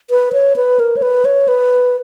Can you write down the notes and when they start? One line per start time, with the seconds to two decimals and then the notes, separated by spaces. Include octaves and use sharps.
0.10 B4
0.33 C#5
0.56 B4
0.80 A#4
0.97 C#5
1.02 B4
1.25 C#5
1.48 B4